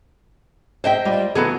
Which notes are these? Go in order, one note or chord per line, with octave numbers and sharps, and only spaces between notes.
G#4 C5 D#5 E5 G5
G3 D4 F4
C#3 E3 F#3 B3 G#4 A4